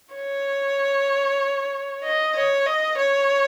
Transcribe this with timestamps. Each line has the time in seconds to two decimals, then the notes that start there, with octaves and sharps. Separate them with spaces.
0.15 C#5
2.04 D#5
2.35 C#5
2.66 D#5
2.97 C#5